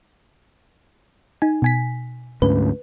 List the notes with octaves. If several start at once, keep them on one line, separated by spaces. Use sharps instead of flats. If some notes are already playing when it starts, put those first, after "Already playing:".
D#4 G#5
B2 G#5 B6
D2 G#2 C#4 B4